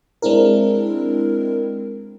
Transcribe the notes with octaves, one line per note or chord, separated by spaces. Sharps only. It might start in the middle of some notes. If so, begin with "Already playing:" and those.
G#3 C4 D4 E4 A#4